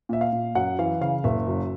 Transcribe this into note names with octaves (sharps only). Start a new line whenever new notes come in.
A#2 E5
F5
A#2
F#2 F#5
E3 F5
C#3 F5
F#1 E5
F#2